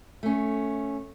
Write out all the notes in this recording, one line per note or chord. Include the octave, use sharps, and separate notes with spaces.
A3 C#4